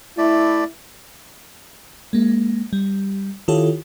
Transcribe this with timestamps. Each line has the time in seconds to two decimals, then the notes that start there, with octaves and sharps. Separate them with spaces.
0.18 A3 E4 D5
2.13 G#3 A#3
2.73 G3
3.48 D#3 E4 F4 G4 A4 C#5